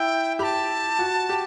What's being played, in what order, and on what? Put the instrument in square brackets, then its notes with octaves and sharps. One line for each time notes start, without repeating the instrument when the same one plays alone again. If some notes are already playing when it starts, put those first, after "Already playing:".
Already playing: [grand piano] E4 [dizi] G5
[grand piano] G4 [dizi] B5
[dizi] A5
[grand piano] F#4
G4